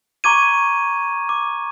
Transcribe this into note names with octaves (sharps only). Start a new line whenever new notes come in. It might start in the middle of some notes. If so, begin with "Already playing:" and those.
A#5 C#6 D6 G#6 D#7
D6